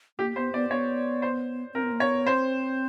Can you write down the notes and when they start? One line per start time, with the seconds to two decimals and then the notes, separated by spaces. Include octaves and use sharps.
0.19 A#3 G4
0.36 B3 C5
0.54 B3 D5
0.70 B3 C#5
1.22 C5
1.74 C4 A#4
1.83 B3
1.92 A#3
2.00 B3 C#5
2.26 C4 C5